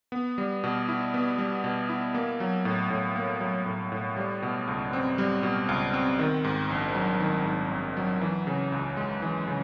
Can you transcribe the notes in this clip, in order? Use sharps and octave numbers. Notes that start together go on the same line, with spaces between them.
B3
G3
B2
E4
B3
G3
B2
E4
A#3
F#3
A2
A2
A#3
F#3
A2
A2
G3
B2
C#2
C4
G3
B2
C#2
C4
D#3
G#2
A#1
F#3
D#3
G#2
A#1
F#3
E3
C#3
C#2
G#3
E3
C#3